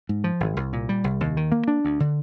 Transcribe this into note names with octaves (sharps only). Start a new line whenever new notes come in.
G#2
F3
G#1
C2
A#2
G3
C2
D#2
D#3
A#3
D4
D2
D3